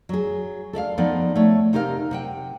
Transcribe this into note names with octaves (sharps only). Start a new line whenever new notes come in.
F#3 G#4
A4 D5 E5 F5
F3 B3 D#4 A4 D5
A3 C#5
C3 D#4 G4 A#4 D5 F5
C3 F#5 G5